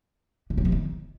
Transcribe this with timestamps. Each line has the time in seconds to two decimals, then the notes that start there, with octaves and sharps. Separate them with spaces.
0.50 C#3
0.57 F#3
0.65 C3
0.72 D#3